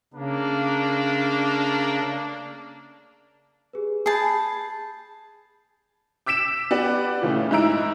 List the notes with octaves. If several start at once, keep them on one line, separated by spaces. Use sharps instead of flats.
C#3 A3 A#3 D4
G4 G#4 B4
G#4 A5 B5 G6 C7
D6 E6 B6 D7 E7
B3 G4 D5
A#2 C#3 E3 A3
G#2 D#4 E4 A#5 E6 D7